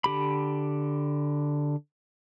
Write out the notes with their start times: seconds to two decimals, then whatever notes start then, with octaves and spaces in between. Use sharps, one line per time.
0.04 D3 G4 B5